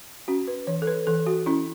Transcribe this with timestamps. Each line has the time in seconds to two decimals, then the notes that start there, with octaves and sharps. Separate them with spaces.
0.28 C#4 F#4
0.48 B4
0.67 E3 C#5
0.82 A4
0.87 B4
1.07 E3 A4
1.27 F#4
1.46 C#4 E4